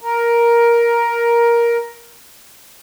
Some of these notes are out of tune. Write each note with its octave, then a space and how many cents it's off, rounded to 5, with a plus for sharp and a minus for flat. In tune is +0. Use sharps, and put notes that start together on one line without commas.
A#4 +10